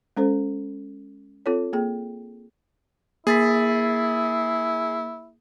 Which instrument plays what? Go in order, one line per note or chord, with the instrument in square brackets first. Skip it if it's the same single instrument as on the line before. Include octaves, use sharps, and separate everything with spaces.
[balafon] G#3 C#4 A4 C5
C4 F4 A4 C#5
A#3 G#4 G5
[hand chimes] A#3 A6 B6 [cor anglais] E4 [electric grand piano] G#4